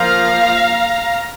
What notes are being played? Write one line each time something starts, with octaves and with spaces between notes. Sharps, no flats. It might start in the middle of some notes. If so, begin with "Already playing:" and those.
Already playing: F3 A#3 F5 A#5